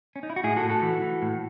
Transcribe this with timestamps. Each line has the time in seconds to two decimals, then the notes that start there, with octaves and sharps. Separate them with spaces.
0.16 C#4
0.23 D#4
0.30 E4
0.36 F#4
0.44 A2 E4 G#4
0.57 F#4 A4
0.63 A2
0.70 F#4 A4
0.82 E3
1.02 E3
1.22 A2